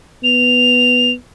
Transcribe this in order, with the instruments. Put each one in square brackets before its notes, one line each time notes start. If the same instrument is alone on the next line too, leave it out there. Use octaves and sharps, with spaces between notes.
[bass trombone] B3 [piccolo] F7